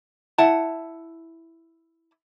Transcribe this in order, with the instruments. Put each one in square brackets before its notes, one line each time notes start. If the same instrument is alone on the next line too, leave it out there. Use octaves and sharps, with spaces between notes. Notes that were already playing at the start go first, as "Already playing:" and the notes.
[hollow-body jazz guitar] E4 F#5 A5